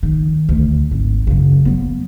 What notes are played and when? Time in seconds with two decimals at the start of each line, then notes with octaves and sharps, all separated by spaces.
0.03 D#3
0.49 D2
0.91 G#1
1.27 F#2 C#3
1.65 F#3 B3